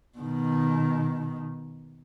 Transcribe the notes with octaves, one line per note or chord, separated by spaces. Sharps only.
B2 D#3